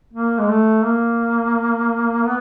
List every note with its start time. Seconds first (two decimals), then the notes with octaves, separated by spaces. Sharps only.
0.13 A#3
0.39 G#3
0.49 A3
0.85 A#3
2.25 B3